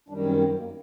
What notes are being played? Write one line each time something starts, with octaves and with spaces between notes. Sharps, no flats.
F#2 D#3 G3 D4
C4
C4
A#3